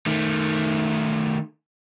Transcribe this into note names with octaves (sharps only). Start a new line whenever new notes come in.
D#3 A3